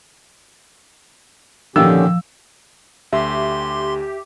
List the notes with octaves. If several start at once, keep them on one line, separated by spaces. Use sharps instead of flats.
A#2 D3 D#3 F3 C#4 G4 E6
D2 G4 E5 C6